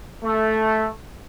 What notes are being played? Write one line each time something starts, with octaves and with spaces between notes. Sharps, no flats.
A3